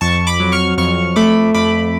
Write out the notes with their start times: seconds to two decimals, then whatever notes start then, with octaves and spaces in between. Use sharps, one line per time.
0.01 F2 A5 C#6
0.27 B5 D6
0.40 F#3
0.52 C#6 F6
0.78 F2 C#6 F6
1.16 A3 B5 D6
1.54 F2 B5 D6